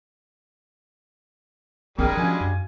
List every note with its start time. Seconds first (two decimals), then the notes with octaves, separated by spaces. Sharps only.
1.99 G3 G#3 D4 G#4 A#4 G5
2.17 F3 C#4 F#4 F5 G#5
2.41 F#2